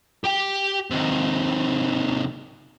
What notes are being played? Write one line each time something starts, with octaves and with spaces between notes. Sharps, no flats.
G4 G5
C3 D#3